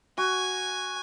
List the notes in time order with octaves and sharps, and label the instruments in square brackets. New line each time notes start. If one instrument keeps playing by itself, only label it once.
[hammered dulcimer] F#4 [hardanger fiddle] G#5